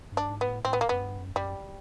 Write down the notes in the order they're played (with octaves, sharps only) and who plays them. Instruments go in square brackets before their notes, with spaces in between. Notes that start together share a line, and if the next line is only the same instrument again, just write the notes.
[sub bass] G2
[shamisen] D4
[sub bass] G#2
[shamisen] B3
[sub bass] A2
[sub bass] A2 [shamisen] C4
[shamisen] B3
A#3
[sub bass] F#2 [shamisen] B3
[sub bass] G2
F#2
[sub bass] F#2 [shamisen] G3